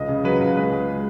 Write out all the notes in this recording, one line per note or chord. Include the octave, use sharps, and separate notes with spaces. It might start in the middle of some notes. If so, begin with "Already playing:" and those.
Already playing: C#2 D#5
C#3
F#3 B4
C#2
G#3 B4
G#3